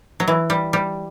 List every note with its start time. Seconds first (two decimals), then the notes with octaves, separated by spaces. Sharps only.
0.20 F#3
0.28 E3
0.50 G3
0.73 G3